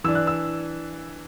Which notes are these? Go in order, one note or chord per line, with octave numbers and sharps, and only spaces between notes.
E3 D4 E6
F#6
E6